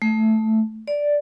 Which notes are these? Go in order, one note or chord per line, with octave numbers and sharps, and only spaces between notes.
A3
D5